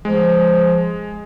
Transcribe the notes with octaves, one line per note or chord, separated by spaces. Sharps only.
F3 G#3